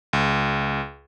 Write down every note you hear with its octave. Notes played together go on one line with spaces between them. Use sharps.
C#2